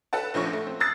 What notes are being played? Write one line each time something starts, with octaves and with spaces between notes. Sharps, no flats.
A4 B4 F#5 A5
A#1 F3 A3 C#4 C#6
A3
C4
D#6 E6 F#6 G#6 A6 C7